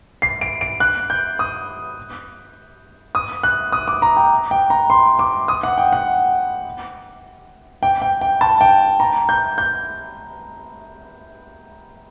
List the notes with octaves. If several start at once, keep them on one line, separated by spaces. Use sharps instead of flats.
C7
D7
D7
F#6
G6
D#6
D#6
F#6
D#6
D6
A#5
G5
G5
A#5
C6
D6
D#6
F#5
G5
F#5
G5
G5
G5
A5
G5
A#5
G6
G6